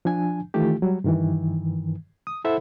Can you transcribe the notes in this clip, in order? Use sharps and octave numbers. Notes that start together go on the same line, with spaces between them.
F3 D4 G#5
D#3 E3 A3 F4 G4
F#3 G3
G2 D#3 E3
D#6
E4 A4 C5 E5 F#5 B5